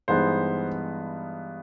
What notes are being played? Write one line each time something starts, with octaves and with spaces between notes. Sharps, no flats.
G2 E3 G#3 B3 D#4 C5